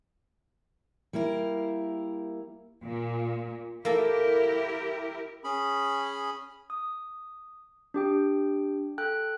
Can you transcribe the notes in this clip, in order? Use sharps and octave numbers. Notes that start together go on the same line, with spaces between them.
G3 A#3 E4 A#4
A#2
A#3 E4 G4 A4 A#4
C#4 G#4 B5
D#6
D4 G4 G5
A4 G5 F#6